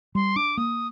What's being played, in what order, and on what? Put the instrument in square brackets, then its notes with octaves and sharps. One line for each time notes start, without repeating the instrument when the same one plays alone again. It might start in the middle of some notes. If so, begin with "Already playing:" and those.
[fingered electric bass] G3 [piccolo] C6
[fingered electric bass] D4 [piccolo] D6
[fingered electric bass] A#3 [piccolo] D#6